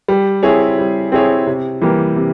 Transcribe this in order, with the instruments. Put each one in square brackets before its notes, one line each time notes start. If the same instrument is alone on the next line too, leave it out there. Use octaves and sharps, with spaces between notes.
[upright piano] G3
C4 E4 G#4 C#5
G3
C4 E4 G#4 C#5
C3
E3 G3 A#3
C3